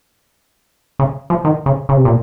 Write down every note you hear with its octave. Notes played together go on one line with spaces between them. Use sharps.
C#3
F3
D#3
C#3
C#3
C3
A#2